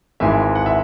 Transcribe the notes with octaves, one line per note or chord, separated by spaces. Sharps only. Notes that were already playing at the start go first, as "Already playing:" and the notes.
G#1 G#2 E3 E5 G#5
F#5
E5